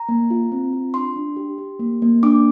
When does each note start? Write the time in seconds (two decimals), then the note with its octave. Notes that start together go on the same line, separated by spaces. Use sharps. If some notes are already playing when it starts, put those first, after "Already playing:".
Already playing: A#5
0.09 A#3
0.30 F4
0.52 C4
0.73 F4
0.94 D4 C6
1.16 D4
1.37 G4
1.58 G4
1.80 A#3
2.02 A#3
2.23 D4 D6